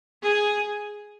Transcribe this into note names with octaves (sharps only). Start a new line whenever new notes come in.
G#4